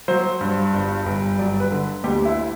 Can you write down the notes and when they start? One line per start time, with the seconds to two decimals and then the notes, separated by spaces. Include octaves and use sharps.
0.08 F#3 C5
0.41 G2
0.74 G1
1.06 G1
1.38 F#3 D5
1.60 B4
1.71 D3
2.04 D2 G4
2.25 E4